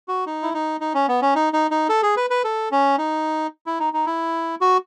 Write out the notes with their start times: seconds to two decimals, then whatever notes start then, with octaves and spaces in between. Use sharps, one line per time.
0.08 F#4
0.26 D#4
0.43 E4
0.54 D#4
0.80 D#4
0.94 C#4
1.08 B3
1.22 C#4
1.35 D#4
1.53 D#4
1.71 D#4
1.89 A4
2.03 G#4
2.17 B4
2.30 B4
2.44 A4
2.72 C#4
2.98 D#4
3.66 E4
3.80 D#4
3.93 D#4
4.06 E4
4.61 F#4